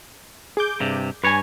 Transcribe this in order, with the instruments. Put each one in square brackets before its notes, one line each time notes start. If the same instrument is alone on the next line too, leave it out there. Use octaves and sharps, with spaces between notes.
[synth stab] G#4 D6 G6
[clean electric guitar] G2 C3
[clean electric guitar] G2 C#5 [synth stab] B4 G#5